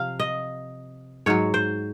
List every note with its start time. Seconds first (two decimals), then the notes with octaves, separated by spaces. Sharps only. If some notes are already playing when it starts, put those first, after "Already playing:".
Already playing: C3 F3 F5
0.20 D#5
1.26 G#2 F#3 C#5
1.54 C5